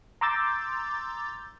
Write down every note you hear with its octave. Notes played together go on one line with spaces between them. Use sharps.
A#5 C6 D6 E6 G6 A6